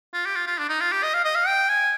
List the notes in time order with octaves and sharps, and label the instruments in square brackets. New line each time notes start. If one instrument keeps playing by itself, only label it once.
[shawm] F4
G4
F4
F4
D4
D#4
F4
G4
D#5
F5
D#5
F5
G5
G#5